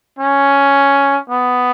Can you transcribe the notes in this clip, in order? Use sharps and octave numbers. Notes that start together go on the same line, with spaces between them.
C#4
B3